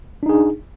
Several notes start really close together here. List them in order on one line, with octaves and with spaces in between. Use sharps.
D4 D#4 G#4